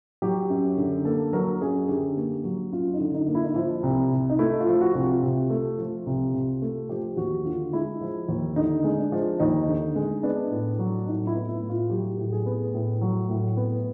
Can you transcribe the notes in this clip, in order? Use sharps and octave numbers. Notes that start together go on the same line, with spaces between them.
F#3 G4
F#2
D3
A#3 A4
F#3 A#4
F#2 G#4
D3 G4
A#3
F#3
F#2 F4
D#4
D3
D#4
A#3
E4
D#4
F3 E4
C2
C3
D#4
A3 E4
F4
F3
F#4
C2 F#4
F4
C3
A3
F3
C2
C3
A3
F3 G4
D#2 F#4
D3 F4
G#3 E4
F3
D#2
D3 D#4
G#3
D4
F3
D#2 D#4
D3
G#3
B3 D4
A2
F#3
A2 D#4
E4
B3
E4
A2
F4
F#3 G4
A2
G#4
B3
A2
F#3
A2
B3